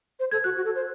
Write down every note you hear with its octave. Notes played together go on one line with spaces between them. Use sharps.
C5
A4 G#6
F#4 F#6
F#4
A4
C5